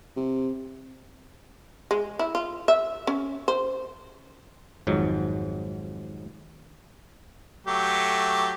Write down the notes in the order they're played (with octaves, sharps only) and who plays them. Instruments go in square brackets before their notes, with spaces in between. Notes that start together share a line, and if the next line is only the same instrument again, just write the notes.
[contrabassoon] C3
[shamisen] G#3
E4
F4
E5
C#4
C5
[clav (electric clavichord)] G#1 F2 G#2 F#3
[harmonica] F#3 A3 G4